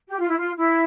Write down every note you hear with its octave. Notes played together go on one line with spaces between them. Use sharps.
G4
F4
E4
F4
E4